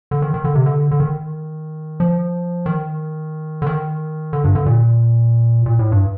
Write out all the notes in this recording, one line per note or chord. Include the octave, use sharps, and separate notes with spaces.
D3
D#3
D#3
D3
C3
D3
D3
D#3
F3
D#3
D3
D#3
D3
G2
D3
A#2
A#2
A2
G2